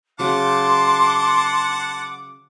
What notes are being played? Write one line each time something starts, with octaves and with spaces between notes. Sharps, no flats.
C#3 F#3 F#5 A5 C6 D6